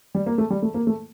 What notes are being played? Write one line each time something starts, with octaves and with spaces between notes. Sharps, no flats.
G3
A#3
A3
G3
A3
A#3
A3